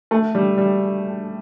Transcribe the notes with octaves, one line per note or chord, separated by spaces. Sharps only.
A3
G3
G3